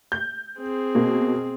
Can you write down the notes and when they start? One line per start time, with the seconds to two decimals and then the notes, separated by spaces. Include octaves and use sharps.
0.12 G6
0.59 C4 G#4
0.95 B2 A#3